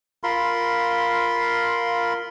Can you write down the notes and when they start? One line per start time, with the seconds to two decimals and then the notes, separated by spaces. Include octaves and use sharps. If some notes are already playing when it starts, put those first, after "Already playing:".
0.24 F4 A#4 B5 C6